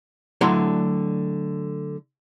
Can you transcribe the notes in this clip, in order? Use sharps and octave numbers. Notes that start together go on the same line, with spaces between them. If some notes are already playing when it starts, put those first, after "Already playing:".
D3 F#3 A3 E4 A#5 C6